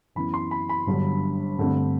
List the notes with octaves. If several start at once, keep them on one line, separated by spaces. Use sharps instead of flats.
F#2 E3 B3 B5
C6
B5
B5
G1 G2 D3 F#3
G2 D3 A3 C4